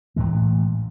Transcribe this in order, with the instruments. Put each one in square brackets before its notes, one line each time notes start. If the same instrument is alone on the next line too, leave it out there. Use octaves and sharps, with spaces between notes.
[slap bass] A1 A2 E3 G#3